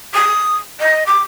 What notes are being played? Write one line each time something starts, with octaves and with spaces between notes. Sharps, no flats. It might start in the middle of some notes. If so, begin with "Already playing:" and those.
D#6
D#5
D6